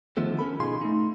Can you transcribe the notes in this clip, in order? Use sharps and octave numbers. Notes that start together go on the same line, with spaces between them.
D3 D#3 F3 A3 B3 A4
C#4 A4 A#4 B5
B2 D#4 F4 G#4 C6
A3 D#4